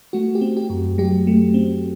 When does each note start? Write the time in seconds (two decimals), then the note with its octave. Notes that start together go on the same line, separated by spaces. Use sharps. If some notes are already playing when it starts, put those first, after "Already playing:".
0.13 A3 F#4
0.35 G4
0.41 C4
0.57 G4
0.70 F#2
0.98 F#3 G4
1.27 A3
1.54 C4